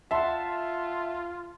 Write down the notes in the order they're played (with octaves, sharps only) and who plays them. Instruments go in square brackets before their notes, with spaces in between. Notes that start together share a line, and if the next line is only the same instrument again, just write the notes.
[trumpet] F4 [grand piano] E5 F#5 [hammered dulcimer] A5 C6